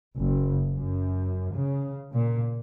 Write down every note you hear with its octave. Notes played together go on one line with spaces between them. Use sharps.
F#1
F#2
C#3
A#2